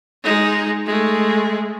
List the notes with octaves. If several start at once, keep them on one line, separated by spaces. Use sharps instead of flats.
G#3 D#4
G#3 A3